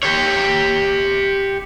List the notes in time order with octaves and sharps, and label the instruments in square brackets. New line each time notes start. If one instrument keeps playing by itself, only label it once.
[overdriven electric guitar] G4 C#5